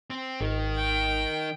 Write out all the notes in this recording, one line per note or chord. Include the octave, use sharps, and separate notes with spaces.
C4
G#1 D#3
G5